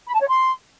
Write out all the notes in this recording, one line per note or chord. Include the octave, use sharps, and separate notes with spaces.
B5
A5
C#5
C6